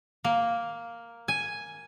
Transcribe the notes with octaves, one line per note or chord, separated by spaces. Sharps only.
A#3
G#5